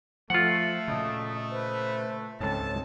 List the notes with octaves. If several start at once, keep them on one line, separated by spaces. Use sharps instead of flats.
F3 A3 F4 F#5
A#2 C#3 D#5 A5 D#6
B4 C5 G#5
C#2 G#2 C4 A4 C#5 A5